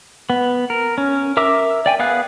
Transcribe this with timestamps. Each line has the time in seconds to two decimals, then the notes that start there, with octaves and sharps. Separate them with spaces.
0.30 B3
0.70 A#4
0.98 C#4
1.37 A#4 E5 D6 E6
1.86 D5 G5 G#5
1.99 B3 G#4 F5 F#6